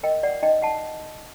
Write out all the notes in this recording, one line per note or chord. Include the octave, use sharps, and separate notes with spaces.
A#4 D#5 G5
D5 F#5
D#4 D#5 G5
F#5 A5